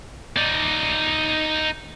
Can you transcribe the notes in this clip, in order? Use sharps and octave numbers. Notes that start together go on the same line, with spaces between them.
D#4 D5